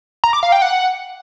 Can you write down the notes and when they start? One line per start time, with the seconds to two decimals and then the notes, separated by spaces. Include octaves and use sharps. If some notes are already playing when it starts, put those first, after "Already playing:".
0.24 A#5
0.33 D6
0.43 F5
0.52 G5
0.62 F#5